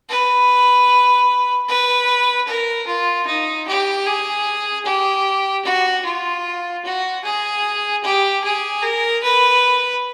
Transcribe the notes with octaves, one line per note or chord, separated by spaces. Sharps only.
B4
B4
A#4
F4
D#4
G4
G#4
G4
F#4
F4
F#4
G#4
G4
G#4
A#4
B4